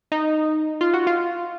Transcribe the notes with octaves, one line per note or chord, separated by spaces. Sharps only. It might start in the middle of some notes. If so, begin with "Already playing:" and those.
D#4
F4
F#4
F4